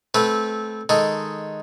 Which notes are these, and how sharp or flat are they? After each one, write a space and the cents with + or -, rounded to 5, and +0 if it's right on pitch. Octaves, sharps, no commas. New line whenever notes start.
A3 -20 C4 +0 B4 -15
D#3 +0 G#3 +0 A4 +0